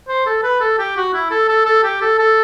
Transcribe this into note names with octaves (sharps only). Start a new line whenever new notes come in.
C5
A4
B4
A4
G4
F#4
E4
A4
A4
A4
G4
A4
A4